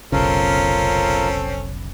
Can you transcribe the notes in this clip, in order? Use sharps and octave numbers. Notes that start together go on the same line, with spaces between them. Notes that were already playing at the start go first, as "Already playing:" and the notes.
F1 B1 C#3 C4 C#4 F4 A4 A#4